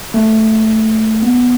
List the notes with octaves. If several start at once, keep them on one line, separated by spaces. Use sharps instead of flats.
A3
B3